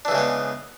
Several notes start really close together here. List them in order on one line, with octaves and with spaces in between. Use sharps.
D4 E3 C#3 G#3 B3